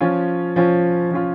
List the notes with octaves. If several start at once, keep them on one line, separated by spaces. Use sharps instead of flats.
F3 C#4 F4
F3 C#4 F4
F3 C#4 F4